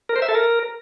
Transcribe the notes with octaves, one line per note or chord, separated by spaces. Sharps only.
A#4
C5
E5
A4
A#4